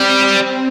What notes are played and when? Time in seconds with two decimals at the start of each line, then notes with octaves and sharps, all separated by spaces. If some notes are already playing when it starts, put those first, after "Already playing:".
Already playing: G3 C4
0.20 C4